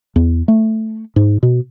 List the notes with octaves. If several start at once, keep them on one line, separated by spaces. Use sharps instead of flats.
E2
A3
G#2
B2